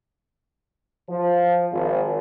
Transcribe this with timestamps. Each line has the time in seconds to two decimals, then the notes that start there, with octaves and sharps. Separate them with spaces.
1.09 F3
1.71 G#1